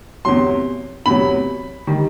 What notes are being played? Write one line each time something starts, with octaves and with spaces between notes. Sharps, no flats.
E2 C3 F#3 C6
E2 C3 F#3 B5
D#3 G3